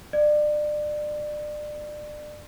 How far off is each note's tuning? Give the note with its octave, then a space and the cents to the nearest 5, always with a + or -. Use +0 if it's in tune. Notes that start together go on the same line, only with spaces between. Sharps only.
D5 +30